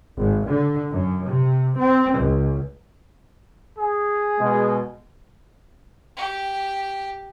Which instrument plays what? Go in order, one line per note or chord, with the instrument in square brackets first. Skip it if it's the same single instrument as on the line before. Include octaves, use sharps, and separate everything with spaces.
[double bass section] G#1
D3
F#2
C3
C4
C#2
[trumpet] G#4
[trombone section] B2 G#3
[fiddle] G4